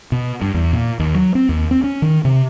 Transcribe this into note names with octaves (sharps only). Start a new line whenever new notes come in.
B2
G2
E2
A#2
D#2
F#3
C4
D#2
C4
C#4
D#3
C3